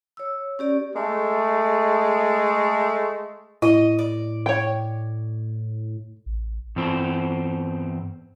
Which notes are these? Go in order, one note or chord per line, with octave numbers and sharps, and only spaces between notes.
C#5 E6
C#4 G4 D5
G#3 A3
A2 E4 D#5
D5
C#5 G5
A1
E2 G2 C4